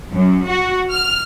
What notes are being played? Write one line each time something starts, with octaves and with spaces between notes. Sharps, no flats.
F#2
F#4
F6